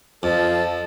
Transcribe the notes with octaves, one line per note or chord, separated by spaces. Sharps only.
F2 F3 A4